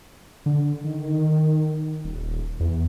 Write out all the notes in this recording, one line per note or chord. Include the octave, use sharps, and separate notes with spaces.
D3
D#3
D#1
E2